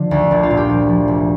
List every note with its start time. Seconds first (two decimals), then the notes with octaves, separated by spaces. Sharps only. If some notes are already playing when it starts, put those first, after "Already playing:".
Already playing: D3 F3 F4
0.11 D2
0.31 A#1 D4
0.43 F4
0.50 A#2
0.57 G4
0.69 F3
0.88 F3
1.08 F1